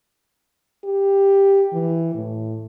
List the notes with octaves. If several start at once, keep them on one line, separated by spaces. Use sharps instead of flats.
G4
E3
A2